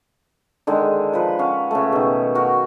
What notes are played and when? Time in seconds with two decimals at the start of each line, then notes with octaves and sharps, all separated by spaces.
0.67 D3 D#3 G#3
1.13 F3 B4
1.39 C#4 F5 F#5
1.71 C#3 A3
1.92 B2 D#3
2.35 F#4 A#4